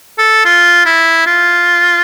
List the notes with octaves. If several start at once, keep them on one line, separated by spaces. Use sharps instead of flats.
A4
F4
E4
F4